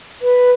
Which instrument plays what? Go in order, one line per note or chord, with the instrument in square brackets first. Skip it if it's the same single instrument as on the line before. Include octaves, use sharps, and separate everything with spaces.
[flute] B4